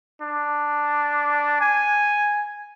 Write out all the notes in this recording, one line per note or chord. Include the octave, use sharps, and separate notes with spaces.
D4
G#5